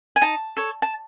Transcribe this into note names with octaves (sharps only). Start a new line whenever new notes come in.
G#5
D#4 A5
A4 C#5
A5